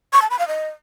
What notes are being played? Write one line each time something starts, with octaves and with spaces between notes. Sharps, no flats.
C#6
A5
B5
F5
D#5